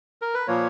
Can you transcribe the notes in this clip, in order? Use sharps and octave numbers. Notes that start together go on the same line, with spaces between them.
A#4
B4
A#2 F3 A#3 C#5